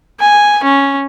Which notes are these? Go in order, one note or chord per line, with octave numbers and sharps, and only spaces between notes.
G#5
C#4